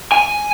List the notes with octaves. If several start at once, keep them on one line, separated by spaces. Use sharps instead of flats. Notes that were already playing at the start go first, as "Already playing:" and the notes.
G#5